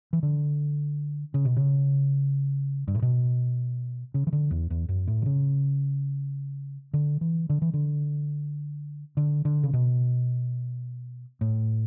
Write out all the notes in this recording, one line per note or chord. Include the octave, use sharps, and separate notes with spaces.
E3
D3
C#3
B2
C#3
G2
A2
B2
C#3
E3
D3
E2
E2
F#2
A2
D3
C#3
D3
E3
D3
E3
D3
D3
D3
C#3
B2
A2